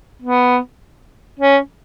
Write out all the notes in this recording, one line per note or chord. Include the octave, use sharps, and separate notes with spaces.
B3
C#4